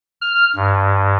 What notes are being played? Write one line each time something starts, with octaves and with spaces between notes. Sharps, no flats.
F6
G2